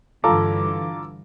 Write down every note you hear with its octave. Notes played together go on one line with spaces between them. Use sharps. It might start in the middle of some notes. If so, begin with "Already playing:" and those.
G2 D3 E3 F4 A4 F5 A#5 D6